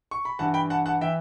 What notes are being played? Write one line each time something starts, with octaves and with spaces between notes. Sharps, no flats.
C#6
B5
G2 E3 F#5 A5
G5 B5
F#5 A5
F#5 A5
E3 E5 G5